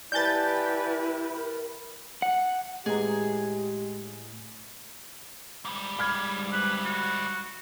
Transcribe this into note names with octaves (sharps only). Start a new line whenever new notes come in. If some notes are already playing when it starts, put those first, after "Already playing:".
E4 G4 B4 D5 G#5 A5 G6 A6
A#4 B5
F#5
A2 G#3 G4 G#4 B4 A#5
G#2 G3
B5 F6 G#6
B4
F#4